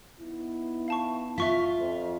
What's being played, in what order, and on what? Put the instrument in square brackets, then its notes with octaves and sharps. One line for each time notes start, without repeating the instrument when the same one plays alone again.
[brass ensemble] B3 D#4 E4
[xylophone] F5 A5 C#6
[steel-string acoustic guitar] F4 [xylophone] E5 C#6 B6
[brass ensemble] F2